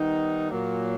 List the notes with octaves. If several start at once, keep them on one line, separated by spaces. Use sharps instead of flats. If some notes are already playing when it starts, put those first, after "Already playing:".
Already playing: D#3 G3 B3 D#4
A#2 F#3 A#3